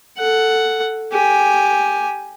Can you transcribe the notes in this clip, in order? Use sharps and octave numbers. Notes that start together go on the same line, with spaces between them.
A4 F#5
G4 G#5